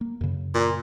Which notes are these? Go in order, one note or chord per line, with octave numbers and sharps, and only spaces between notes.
A#3
F#2 C#3
A#2